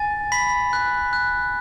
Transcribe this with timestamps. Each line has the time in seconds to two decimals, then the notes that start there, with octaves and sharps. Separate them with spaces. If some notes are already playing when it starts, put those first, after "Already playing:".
Already playing: G#5 A6
0.32 B5 B6
0.73 F#6
1.13 F#6